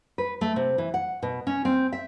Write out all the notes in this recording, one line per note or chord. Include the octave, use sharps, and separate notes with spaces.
B4
A3
C3
E3
F#5
B2
C#4
C4
E5